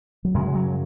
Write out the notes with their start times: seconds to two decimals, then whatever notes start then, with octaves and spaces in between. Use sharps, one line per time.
0.25 F#3
0.34 F#2 C#3 G#3
0.55 F#3